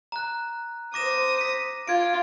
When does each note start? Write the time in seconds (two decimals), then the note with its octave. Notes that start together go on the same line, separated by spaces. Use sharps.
0.12 A#5 F#6
0.94 C5 D6 D#6 A#6 E7
1.41 A#6 B6
1.88 F4 G#6 D7